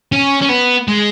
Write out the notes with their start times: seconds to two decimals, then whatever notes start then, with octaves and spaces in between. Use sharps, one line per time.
0.12 C#4
0.42 C#4
0.49 B3
0.88 G#3